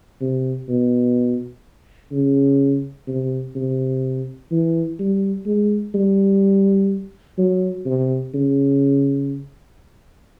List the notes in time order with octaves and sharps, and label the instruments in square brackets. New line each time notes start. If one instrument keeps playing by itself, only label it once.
[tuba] C3
B2
C#3
C3
C3
E3
G3
G#3
G3
F#3
C3
C#3